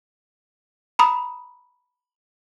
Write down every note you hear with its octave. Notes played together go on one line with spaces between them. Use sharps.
A#5 B5 D#6